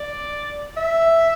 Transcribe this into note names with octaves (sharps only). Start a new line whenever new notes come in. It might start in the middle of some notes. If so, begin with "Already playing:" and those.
Already playing: D5
E5